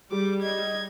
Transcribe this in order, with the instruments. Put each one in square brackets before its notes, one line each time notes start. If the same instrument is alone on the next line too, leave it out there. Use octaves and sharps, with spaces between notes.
[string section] G3 [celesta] G4 G#4 [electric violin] D6
[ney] D#5 [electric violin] G#6